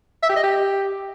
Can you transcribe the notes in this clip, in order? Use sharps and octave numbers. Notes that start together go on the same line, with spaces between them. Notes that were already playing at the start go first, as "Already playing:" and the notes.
E5
G4
D#5
G4